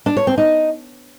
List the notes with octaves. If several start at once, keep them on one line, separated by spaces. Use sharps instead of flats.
D4
C#5
C4
D#4